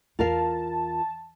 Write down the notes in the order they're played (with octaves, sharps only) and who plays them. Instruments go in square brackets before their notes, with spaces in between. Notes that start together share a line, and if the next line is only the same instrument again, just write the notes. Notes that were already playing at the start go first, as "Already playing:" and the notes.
[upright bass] E2 [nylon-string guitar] F4 A#4 F5 [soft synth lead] A5